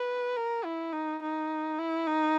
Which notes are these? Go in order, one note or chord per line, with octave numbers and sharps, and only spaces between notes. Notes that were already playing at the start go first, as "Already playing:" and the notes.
Already playing: B4
A#4
E4
D#4
D#4
E4
D#4